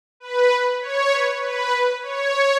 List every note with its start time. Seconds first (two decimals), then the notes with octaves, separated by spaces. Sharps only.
0.20 B4
0.81 C#5
1.12 B4
1.41 B4
2.02 C#5